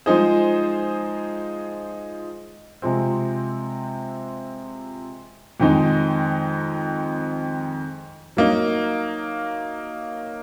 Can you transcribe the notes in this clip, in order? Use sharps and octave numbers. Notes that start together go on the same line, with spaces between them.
F3 G#3 D#4 G#4 C5
C3 F3 G#3 C4
F2 D#3 G#3 D#4
F#3 A#3 D#4